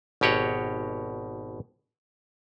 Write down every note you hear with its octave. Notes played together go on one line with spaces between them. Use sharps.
G#1 B2 G4 C#5 D#5 F#5